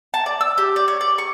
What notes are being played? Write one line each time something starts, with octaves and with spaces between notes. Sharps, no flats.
A5
D5
E6
G4
D5
C#5
D5
C#6